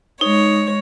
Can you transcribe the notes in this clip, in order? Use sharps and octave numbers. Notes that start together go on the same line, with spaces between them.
G#3 D#4 C#5